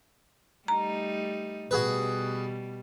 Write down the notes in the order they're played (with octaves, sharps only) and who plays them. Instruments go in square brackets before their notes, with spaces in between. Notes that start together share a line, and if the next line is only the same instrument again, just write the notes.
[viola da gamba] G3 A3 D#4 [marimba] A#5
[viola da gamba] B2 G3 [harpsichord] F#4 G#4 B4